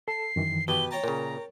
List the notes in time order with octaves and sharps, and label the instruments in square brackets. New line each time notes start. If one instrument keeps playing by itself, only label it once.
[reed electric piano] A4 A5 [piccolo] C7
[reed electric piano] F#2 D#3 E3
[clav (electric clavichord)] B2 [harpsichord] G4 B4 [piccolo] G7
[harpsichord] C#5 G5 A5 [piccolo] A#5
[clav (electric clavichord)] A#2 C#3 [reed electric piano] A#4